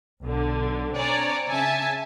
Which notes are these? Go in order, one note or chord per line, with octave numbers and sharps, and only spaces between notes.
B1 D3
C4 D4 C#5 D5 G#5 A#5
C#3 E5 G#5 A5